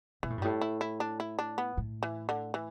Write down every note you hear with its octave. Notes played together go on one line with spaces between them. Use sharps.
B2 E3
A2
G2
A2 G3
E4
E4
D4
E4
D4
B3
A2
E3
D3
E3